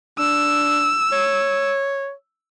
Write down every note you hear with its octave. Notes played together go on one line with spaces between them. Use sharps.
D4 E6
C#5